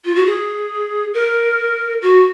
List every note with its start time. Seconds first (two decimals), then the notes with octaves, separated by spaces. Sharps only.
0.05 F4
0.15 F#4
0.25 G#4
1.14 A#4
2.02 F#4